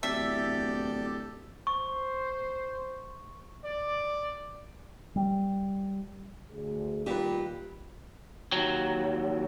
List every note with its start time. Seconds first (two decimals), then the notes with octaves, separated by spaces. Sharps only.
0.03 D1 E2 G4 A4 D5 E5 G6
1.67 C5 C#6
3.65 D5
5.16 G3
6.51 D2 G#4
7.06 A#2 D#3 G3 G4 B4
8.52 D#2 F#3